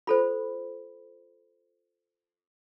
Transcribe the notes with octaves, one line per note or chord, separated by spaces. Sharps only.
F4 A4 C5 B5